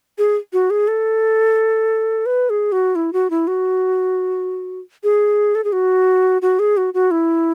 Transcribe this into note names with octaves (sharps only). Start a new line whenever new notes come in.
G#4
F#4
G#4
A4
B4
G#4
F#4
E4
F#4
E4
F#4
G#4
A4
G#4
F#4
F#4
G#4
F#4
F#4
E4